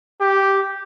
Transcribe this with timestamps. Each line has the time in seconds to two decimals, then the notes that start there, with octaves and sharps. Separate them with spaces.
0.21 G4